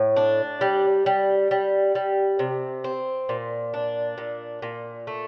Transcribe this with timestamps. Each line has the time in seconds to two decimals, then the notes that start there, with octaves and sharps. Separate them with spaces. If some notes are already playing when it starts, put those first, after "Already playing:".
Already playing: A2
0.16 D4
0.61 G3
1.06 G3
1.51 G3
1.95 G3
2.39 C3
2.84 C4
3.29 A#2
3.74 D4
4.18 A#2
4.62 A#2
5.07 A3